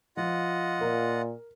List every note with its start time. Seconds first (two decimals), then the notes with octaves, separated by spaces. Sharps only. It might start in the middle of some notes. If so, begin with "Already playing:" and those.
0.17 F3 F4 D#5 F#5
0.81 A#2 A#4